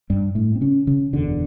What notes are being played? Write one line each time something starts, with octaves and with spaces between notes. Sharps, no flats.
G2 G3
A2 A3
C4
C#3 C#4
C#3 C#4
F#1 E2 B2 D3 D4